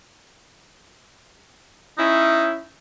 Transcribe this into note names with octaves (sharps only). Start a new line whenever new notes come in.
C#4 D#4 E4